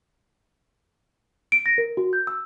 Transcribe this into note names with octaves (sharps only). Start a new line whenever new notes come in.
D7
A#6
A#4
F#4
G6
E6